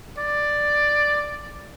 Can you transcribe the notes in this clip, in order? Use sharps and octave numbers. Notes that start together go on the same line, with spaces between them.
D5